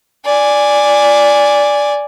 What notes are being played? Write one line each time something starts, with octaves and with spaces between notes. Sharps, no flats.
D5 G#5